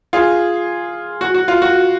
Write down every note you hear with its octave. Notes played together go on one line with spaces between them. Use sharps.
F4 G#4
F#4
F#4
F4
F#4